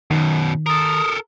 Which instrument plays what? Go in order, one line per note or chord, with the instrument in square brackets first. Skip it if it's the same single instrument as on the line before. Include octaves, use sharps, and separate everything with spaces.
[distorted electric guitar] F#2 B2 [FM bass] D#3
[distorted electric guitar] A4 A#4 [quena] D#6